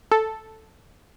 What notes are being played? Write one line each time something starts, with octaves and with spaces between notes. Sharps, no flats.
A4